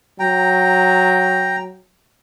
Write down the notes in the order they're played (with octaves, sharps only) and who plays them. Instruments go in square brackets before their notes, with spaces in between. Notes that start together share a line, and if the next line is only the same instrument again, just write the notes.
[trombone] F#3 [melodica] G5 A#5